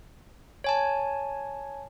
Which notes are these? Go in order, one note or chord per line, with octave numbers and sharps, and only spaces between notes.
C#5 G#5 A5